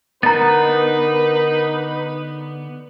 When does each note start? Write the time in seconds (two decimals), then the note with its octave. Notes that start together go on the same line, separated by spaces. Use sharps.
0.23 D3 B3 D#4 A#4 B4 A#5 A6